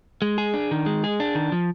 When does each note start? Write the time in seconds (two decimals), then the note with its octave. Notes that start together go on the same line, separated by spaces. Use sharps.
0.22 G#3
0.38 G#4
0.54 D4
0.71 D#3
0.86 G#3
1.04 G#4
1.20 D4
1.35 D#3
1.52 F3